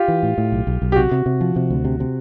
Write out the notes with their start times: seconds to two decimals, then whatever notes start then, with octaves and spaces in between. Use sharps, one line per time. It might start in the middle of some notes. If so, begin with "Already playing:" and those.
Already playing: F4 G4
0.08 E3
0.23 A2
0.38 A2
0.52 B1
0.67 B1
0.82 B1
0.92 G4
0.96 C3 F#4
1.12 C3
1.26 C3
1.41 F3
1.56 C3
1.70 D2
1.85 C3
2.00 C3